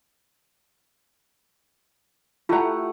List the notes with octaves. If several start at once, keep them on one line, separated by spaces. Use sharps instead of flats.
A3 E4 F4 G4 F#5 A#5